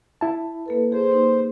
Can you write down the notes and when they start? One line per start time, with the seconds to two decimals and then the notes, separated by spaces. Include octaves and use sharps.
0.21 E4 A5
0.66 A#3 A4 B4
0.92 G#4 C5
1.12 A#3 D#4